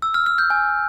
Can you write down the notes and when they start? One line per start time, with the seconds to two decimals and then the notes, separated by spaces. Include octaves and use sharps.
0.02 E6
0.14 F6
0.26 F6
0.38 G6
0.50 G#5